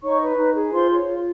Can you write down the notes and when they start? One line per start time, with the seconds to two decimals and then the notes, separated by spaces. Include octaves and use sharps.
0.04 D#4 C#5 C#6
0.21 B4
0.38 D#4
0.56 G#4
0.73 F4 C5 C6
0.90 C#5
1.07 F4